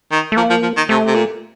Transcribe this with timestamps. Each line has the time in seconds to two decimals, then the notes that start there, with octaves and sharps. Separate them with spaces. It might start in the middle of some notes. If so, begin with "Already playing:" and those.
0.12 D#3
0.32 A3
0.37 F3 A#3
0.50 F3
0.63 F3
0.77 D#3
0.89 C3 A3
1.07 C3
1.15 A#2